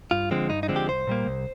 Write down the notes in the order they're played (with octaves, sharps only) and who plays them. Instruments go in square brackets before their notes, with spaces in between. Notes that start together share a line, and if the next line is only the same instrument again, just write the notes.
[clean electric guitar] G2 F4
D3 F3 G#3 C4
G2 D#4
D#4
D3 F3 G#3 C4
G4
C2 C5
A#2 G3 A#3
C2